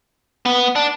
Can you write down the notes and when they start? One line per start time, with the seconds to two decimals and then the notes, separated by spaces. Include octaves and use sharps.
0.45 B3
0.76 D4